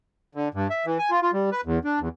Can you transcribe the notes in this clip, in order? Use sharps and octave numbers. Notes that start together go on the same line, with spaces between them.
D3
G2
E5
E3
G#5
F4
F4
G3
B4
E2
D4
E2